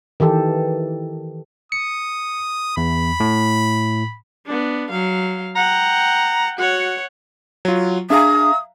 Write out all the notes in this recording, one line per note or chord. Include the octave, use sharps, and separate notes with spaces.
D#3 E3 G4 A4
D#6 C#7
E2 B5
A2
B3 D4
F#3 F5
F#5 G5 A#5
F#4 C#5 F#5
F#3 F4
D4 G#4 E5 F5 A#5 D#6